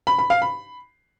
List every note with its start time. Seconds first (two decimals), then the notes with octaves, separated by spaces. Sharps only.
0.07 B5
0.19 B5
0.30 F5
0.42 B5